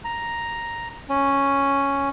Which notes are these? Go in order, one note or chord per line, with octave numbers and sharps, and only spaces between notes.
A#5
C#4